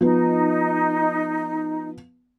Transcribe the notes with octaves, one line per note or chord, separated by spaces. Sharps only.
F3 B3 D#4